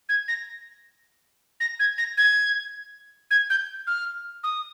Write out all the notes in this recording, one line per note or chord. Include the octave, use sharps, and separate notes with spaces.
G#6
A#6
A#6
G#6
A#6
G#6
G#6
G6
F6
D#6